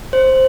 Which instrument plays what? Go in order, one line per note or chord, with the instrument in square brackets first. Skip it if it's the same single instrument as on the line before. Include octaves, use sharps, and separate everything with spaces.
[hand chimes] C5